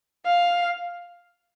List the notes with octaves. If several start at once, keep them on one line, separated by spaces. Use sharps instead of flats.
F5